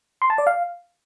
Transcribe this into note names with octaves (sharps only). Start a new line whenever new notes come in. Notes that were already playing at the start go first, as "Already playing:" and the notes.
C6
A5
D5
F5